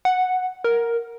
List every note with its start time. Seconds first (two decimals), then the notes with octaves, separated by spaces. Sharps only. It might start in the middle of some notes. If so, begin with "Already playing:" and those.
0.05 F#5
0.64 A#4